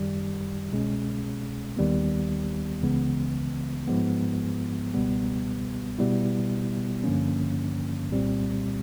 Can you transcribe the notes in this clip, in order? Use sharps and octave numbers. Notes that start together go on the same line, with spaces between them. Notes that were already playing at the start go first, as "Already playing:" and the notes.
Already playing: F#2 D#3 G3
C2 B2 G#3 C#4
D#2 D#3 G3 B3
C#2 C#3 E3 G#3 B3
G#2 F3 G#3 B3
C#2 B2 G3 B3
B2 G3 B3 E4
G2 D3 F3 A#3 C#4
C2 A#2 G3 C4